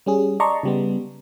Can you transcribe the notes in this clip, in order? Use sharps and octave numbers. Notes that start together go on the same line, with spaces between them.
G3 C#4 G#4
D5 D#5 A5 A#5 C6 C#6
C#3 G3 B3